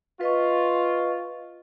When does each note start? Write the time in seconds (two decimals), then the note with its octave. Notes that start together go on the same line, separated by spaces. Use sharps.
0.21 F4 B4 D#5 C#6